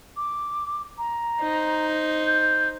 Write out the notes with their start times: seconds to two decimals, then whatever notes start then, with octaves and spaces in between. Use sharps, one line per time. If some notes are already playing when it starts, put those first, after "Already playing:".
0.17 D6
0.98 A#5
1.41 D#4 C5
2.27 G6